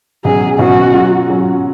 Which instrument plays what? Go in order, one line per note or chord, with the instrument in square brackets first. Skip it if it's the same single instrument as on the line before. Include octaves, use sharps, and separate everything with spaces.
[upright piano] B2 F#3 C#4 [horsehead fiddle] G#4
[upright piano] B2 F#3 C#4 [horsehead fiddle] F#4
[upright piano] F#3 C#4 F4
F#3 C#4 F4